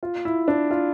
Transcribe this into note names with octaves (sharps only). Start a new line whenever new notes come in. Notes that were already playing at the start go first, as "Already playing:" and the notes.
F4
E4
D4
F4